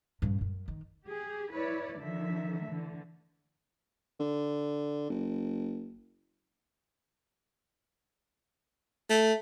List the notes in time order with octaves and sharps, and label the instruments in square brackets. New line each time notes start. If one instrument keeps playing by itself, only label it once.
[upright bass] G2 C#3
F#2
D#3
[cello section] G4 G#4
E4 B4 C#5 D5
D3 D#3 F3 E5
D3 E3 A3
[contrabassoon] D3
F#1
[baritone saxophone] A3